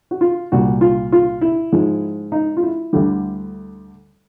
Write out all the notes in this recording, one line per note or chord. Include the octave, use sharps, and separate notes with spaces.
F#4
F4
C2 A#2 G3 F#4
F4
F4
E4
G#2 F3 G#3
D#4
F4
E4
D2 D3 G3